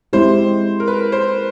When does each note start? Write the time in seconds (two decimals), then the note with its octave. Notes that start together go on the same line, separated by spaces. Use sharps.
0.13 G#3 C4 E4 G4 C5
0.80 A#4
0.87 B4
1.12 C5